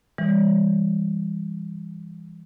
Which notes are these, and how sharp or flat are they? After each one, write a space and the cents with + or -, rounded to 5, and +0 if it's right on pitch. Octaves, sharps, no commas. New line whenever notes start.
E3 +15 G3 +40